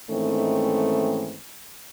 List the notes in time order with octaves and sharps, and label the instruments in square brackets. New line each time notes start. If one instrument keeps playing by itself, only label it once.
[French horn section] G#2 D#3 E3 A3 C4 C#4